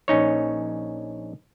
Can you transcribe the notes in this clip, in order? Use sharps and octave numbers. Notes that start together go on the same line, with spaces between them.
A#1 C#4 D#4 C#5